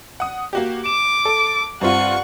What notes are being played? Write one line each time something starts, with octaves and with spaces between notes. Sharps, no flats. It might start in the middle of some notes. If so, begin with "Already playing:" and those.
F#5 D#6
A#3 F#4 G4
D6 E7
A4
G2 C4 F4 F#5 C#6